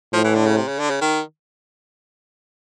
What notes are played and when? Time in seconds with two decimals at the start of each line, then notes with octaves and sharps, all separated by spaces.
0.13 A2 F3
0.24 E3
0.35 D3
0.46 C#3
0.57 C3
0.68 C#3
0.79 D3
0.90 C#3
1.01 D#3